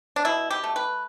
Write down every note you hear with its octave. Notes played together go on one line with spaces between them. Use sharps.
D4
B2 E4
G4
A3
B4